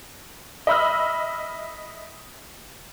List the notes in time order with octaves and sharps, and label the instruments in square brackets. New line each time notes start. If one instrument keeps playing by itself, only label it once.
[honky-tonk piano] D#5 E5 B5 E6 F6